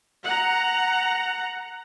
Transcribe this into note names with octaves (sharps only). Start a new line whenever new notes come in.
F#5 A#5